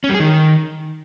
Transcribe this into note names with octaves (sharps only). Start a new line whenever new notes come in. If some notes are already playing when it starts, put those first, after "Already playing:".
C#4
G3
G#4
D#3